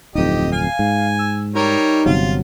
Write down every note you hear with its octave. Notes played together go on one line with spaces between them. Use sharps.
D1 F2 D#4 G4 D#5
F5 G#5
G#2
E6
G3 D#4 A#4 C#5
G1 C3 F#3 F4